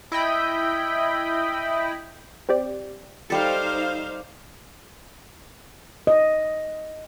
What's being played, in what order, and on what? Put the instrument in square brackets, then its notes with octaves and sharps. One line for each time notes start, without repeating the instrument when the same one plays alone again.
[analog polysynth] E4 D#5 G5 B5
[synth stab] C4 G4 D5
[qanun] G3 A4 [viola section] D#4 C5 F5
[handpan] D#5